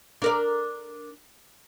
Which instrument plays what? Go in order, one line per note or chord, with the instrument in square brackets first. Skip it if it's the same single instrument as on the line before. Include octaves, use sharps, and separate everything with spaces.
[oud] D4 A#4 D5